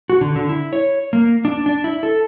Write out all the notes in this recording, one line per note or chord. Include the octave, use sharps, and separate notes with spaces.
F#4
D3
D3
E4
C#5
A#3
D4
D4
E4
A4